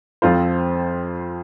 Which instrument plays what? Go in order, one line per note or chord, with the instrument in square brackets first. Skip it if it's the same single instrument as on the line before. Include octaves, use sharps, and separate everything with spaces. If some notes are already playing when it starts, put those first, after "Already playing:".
[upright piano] F2 F3 C4 F4 C5